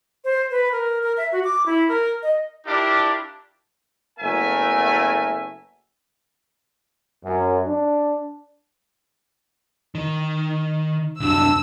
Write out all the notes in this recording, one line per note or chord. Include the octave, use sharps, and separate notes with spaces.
C5
B4
A#4
A#4
E5
F#4
D6
E4
A#4
D#5
D4 E4 F4 G4 A#4
F#1 A3 B3 A#4 E5 G#5
F#2
D4
D#3
C2 F#2 D4 E6